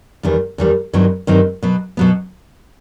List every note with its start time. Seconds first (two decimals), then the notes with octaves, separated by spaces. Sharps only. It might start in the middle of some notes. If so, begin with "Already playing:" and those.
0.23 E2 D#3 G3
0.58 E2 D#3 G3
0.93 G2 D#3 F#3 C4 D#4
1.27 G2 D#3 F#3 C4 D#4
1.63 B2 F#3 B3
1.97 B2 F#3 B3